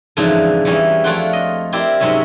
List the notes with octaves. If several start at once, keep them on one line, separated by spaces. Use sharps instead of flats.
F2 G#2 C#3 E3 D4 A5
E2 E3 G3 C#4
F2 A3 D4 F4 F#5 G5
D#5
C4 E4 G4 A#4 D5
G#2 C3 F#3 C#4 E5